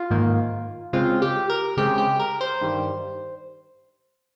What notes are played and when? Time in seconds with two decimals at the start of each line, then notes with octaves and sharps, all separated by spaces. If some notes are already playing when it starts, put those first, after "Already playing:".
Already playing: F4
0.10 G#2 D#3 A#3
0.93 C#3 G#3 C4 F4
1.22 G4
1.50 A#4
1.77 C#3 G#3 C4 G4
1.98 G4
2.20 A#4
2.41 C5
2.61 G2 D#3 G3